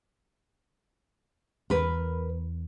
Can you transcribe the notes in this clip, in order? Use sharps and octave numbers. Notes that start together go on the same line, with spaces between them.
E2 A#4 B4